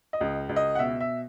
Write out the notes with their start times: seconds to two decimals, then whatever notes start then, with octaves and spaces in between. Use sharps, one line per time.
0.13 D#5
0.21 C#2
0.49 C#2
0.56 D#5
0.75 F#5
0.79 B2 E5
1.01 E5